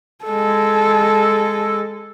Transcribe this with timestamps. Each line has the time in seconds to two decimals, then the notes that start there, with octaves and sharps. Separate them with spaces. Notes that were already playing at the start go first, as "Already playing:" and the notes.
0.24 G#3 A4